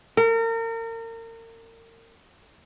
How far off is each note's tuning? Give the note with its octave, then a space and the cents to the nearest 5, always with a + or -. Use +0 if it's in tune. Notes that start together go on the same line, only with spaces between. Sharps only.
A#4 -35